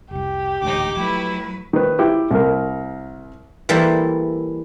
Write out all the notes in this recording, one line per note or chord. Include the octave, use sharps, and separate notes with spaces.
F1 C2 G4
D#1 A1 D2 G#3 D#4 D6
F3 F#3 A3 E4 B4
D#3 B4
E4 G4
C2 A#4
E3 G3 A#3 E4 A4 C5